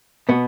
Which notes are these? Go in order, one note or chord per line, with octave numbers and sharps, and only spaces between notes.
B2 B3